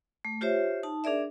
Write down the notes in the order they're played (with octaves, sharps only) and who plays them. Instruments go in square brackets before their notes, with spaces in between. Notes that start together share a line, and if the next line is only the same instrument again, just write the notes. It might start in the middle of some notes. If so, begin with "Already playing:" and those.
[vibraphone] A3
F4 G4 C5 C#5 E5
D#4 A5
D4 G#4 A#4 D5 E5